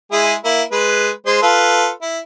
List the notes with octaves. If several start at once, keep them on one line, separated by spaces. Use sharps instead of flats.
G#3 E4 G#4
A#3 E4
G#3 B4
G#3 C5
F4 A4 B4
E4